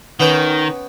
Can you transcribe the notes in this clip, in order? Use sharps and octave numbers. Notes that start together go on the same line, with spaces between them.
D#3 B3 C#4 G5